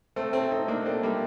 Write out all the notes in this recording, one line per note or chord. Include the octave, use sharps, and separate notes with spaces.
A3 C4
A3 C4
C4 D#4
A#3 D4
A3 C4
G3 A#3